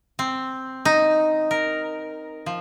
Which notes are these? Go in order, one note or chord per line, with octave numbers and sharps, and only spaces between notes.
C4
D#4
A#4
F3